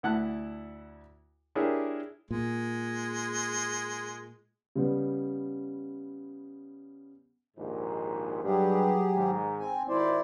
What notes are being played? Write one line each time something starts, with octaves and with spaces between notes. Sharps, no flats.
D2 E4 F#5 A5 F#6
D4 E4 G4 G#4 A#4 C#5
A#2 G#3
C#3 G3 B3
A#1 D#2 G#2
G2 F#3 G4 G#4
G#2 D#3
C4 G#5
G#1 D#3 E4 C5 D5